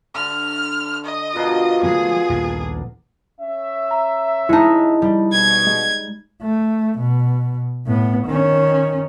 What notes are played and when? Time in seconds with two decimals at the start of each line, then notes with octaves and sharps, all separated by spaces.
0.15 D3 F6
1.05 D#5
1.36 B2 D4 F4 A#4
1.83 F3 G#3 A3 G#4
2.30 A#1 D#2 A#2
3.41 C#4 E5
3.91 A#5
4.49 G#3 D#4 E4 A5
5.02 G3
5.32 B2 G#6
5.67 G#3
6.42 A3
6.99 B2
7.87 A2 B3
8.26 D#3 C#4